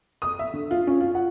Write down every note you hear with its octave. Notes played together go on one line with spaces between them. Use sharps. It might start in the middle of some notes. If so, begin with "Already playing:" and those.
D#6
E5
D3
F4
C#4
F4
F#5